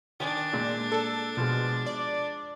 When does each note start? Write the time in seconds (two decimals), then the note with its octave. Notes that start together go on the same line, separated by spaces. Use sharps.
0.20 D#3 D4 G#5
0.53 A#2 G#3 D5
0.92 A4
1.37 B2 F3 G#3
1.86 D5